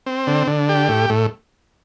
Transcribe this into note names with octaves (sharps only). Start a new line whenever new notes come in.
C4
D3
D3
G4
A2
A2